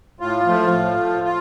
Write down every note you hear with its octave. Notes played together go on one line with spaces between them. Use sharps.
A2 F4
F3 A3
A2
F3 A3
F4